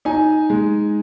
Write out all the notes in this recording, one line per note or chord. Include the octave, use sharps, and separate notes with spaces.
D#4 G#5
G#3